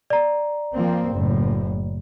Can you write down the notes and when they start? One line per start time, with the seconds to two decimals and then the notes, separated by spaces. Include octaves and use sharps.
0.10 D5 A#5
0.75 F3 A#3 C4
1.12 F#1 A2